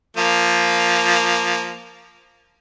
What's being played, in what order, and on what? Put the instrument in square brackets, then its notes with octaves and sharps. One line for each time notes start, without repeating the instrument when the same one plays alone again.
[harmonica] F3 A#3